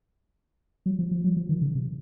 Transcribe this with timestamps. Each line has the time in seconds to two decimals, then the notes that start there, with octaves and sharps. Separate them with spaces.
0.86 F#3
0.99 F3
1.11 F3
1.24 F#3
1.37 F3
1.49 D#3
1.62 C#3
1.75 C3